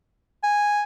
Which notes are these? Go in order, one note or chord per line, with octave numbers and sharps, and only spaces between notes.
G#5